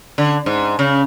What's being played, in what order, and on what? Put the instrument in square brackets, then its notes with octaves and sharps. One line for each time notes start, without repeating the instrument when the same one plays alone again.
[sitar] D3
G#2
C#3